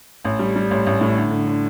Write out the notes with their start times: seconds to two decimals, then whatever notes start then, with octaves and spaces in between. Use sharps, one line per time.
0.25 A1
0.39 G3
0.56 G3
0.71 A1
0.86 A1
1.01 A2
1.16 D3
1.31 D3
1.47 D3